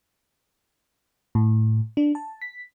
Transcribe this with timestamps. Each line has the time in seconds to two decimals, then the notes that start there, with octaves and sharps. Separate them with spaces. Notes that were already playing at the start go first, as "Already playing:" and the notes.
1.35 A2
1.97 D4
2.15 A5
2.42 B6